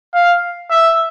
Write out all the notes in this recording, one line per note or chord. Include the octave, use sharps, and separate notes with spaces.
F5
E5